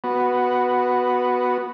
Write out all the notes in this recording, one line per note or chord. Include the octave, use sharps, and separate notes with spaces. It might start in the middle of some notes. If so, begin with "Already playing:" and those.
B3 F#4